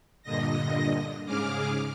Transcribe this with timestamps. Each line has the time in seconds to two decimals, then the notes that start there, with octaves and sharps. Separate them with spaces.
0.23 G2 A#2 D3 D#5 A#6
1.25 G#2 C#3 G#4 D6 F6